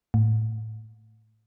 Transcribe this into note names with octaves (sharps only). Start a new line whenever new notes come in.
A2